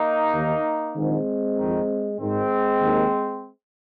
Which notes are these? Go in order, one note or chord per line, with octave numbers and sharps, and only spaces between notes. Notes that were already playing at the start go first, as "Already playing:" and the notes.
Already playing: A#3 D#4
D#2 D#3
A#1 G#2 D#3 G#3 C4
F2 D#3
G#1 G#2 D#3 G#3 C4
D#2 D#3